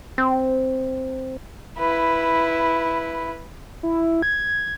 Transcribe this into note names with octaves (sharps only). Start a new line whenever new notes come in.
C4
E4 B4
E4
G#6